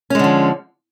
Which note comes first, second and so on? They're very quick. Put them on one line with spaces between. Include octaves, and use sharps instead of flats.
C#4 G#3 D3 F3